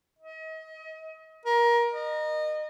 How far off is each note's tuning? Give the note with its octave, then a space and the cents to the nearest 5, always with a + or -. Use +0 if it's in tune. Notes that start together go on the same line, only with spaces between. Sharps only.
D#5 +35
A#4 +20
D#5 -25